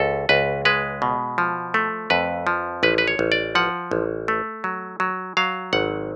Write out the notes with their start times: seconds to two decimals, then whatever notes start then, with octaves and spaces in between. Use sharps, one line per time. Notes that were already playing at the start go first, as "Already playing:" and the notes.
Already playing: C#2 A4
0.29 C#2 B4
0.65 G#3 B4
1.02 B2
1.38 F3
1.74 A3
2.10 F2 B4
2.47 F3
2.83 A1 B4
2.98 B4
3.08 C#5
3.19 A1
3.32 D5
3.55 F3 F#5
3.91 A1
4.28 A3
4.64 F#3
5.00 F#3
5.37 F#3 F5
5.73 G#1 F#5